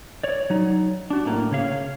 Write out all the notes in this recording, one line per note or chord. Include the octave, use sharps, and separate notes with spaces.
C#5 D5
F#3 D#4
D4 F#4
A2 A#3
C#3 C#5 F5